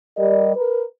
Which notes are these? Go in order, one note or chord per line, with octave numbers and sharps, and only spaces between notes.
G3 G4 A#4 D5 D#5
A#4 B4